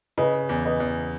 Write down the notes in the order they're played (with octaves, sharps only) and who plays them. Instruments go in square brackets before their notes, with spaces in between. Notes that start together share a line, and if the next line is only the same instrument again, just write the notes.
[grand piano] C#3 [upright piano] B4 D#5
[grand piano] E2
[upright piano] B4 D#5
[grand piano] E2